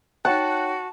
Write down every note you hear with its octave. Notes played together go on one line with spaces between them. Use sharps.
D#4 F#4 C#5 F#5 G5 A5